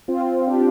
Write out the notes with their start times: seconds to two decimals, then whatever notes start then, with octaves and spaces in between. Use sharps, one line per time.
0.08 C4 F4
0.47 D4 G4